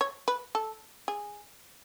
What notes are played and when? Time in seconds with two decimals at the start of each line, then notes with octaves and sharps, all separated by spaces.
0.01 C#5
0.28 B4
0.55 A4
1.08 G#4